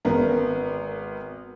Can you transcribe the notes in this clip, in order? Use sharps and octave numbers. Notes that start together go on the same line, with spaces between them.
G#1 B3 A#4